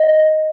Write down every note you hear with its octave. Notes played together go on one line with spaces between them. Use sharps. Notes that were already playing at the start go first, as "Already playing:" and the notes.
Already playing: D#5